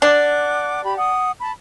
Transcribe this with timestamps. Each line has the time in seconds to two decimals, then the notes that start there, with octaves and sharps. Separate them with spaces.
0.02 D4 F#5 D6 F#6
0.84 G4 B5
0.98 F#5 D#6
1.41 A5 B5